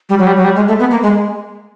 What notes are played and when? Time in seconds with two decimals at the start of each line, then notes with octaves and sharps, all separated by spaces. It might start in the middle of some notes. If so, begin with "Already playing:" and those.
0.09 G3
0.19 F#3
0.27 G3
0.36 F#3
0.44 G3
0.56 G#3
0.68 A3
0.80 B3
0.91 A#3
1.03 G#3